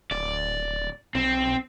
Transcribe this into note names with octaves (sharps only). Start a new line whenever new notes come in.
D1 D5
B1 C4